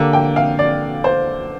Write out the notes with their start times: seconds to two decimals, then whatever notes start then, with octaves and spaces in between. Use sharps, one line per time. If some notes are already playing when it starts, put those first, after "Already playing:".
Already playing: D3 A#3 G4
0.13 G5
0.36 F5
0.59 D5
1.04 C5